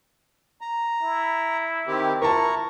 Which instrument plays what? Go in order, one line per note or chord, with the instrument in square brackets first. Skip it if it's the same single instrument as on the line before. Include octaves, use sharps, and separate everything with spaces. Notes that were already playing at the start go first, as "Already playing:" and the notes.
[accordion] A#5
[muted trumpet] E4
[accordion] D#3 C4 G4
[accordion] E4 A#5 C#6 [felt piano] A#4 A5